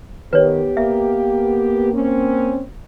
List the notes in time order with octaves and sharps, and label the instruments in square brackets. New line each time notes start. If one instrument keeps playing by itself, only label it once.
[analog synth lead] D#3 [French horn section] B3 G4 [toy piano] B4 C#5
[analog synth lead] A#3 [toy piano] E5
[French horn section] C4 C#4